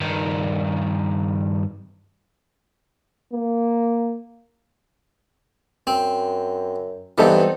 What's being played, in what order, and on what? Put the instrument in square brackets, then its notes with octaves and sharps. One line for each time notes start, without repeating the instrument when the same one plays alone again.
[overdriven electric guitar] G2 D#3
[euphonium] A#3
[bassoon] F#2 [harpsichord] C4
[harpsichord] G2 E3 [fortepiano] B3 D#4 A4 [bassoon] C4